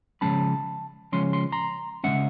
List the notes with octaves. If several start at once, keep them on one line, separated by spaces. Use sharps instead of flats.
C#3 F3 G#3 C#4 A5 B5
C#3 F3 G#3 C#4 C6
C6
A#5 C6
C#3 F3 G#3 C#4 E5 F#5